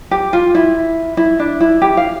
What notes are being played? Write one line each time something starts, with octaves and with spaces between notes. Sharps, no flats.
G4
F4
E4
E4
D4
E4
G4
F5